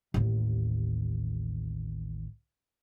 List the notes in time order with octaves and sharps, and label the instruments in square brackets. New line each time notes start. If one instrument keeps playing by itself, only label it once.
[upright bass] A1 D#2